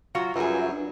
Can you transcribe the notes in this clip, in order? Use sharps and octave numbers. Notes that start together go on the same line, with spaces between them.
F#3 F4 F#4
F#2 G3 F4 G#4 B4 E5
D4